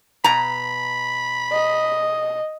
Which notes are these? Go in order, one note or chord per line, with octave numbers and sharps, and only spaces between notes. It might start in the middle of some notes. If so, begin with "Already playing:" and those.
B2 A#5 B5
D#5